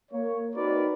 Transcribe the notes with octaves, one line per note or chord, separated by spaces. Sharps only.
A#3 C#5
C4 D#4 F#4 A#4 B4 D5